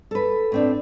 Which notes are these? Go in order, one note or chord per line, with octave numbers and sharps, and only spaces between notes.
A4 B4
A2 C4 D4